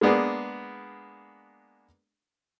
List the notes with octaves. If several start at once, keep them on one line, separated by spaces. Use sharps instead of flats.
G#3 A#3 B3 D4 G#4